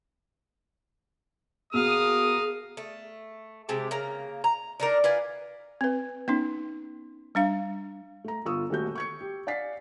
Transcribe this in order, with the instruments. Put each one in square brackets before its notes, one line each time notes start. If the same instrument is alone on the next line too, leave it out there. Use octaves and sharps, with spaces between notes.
[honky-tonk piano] B2 [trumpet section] A#3 A#4 D#6 [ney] G#4 [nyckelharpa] F5
[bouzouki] A3
C3 G#3 G4 A5
C#3 A#3 A#5
A#5
D4 D#4 A#4
F4 B4 F5 G#5
[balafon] C4 B4
B3 C#4 D#4
G3 D4 F5
[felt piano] A3 A#5
G1 F4 C#6 D#6 E6
D#1 A3 F#4 G6
C#6 G#6 C#7
G4
D5 F5 G#5 A6 B6 C7